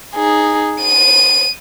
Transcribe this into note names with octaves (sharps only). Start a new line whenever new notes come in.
D#4 G#4
D#7